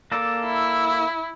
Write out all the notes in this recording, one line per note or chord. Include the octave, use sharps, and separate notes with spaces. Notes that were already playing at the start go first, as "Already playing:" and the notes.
A#3 A4 D5
E4